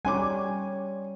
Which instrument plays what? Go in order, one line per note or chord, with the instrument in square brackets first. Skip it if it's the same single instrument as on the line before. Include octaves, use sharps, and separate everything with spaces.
[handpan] G3 C#4 C#5 [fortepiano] G#5 C6 D6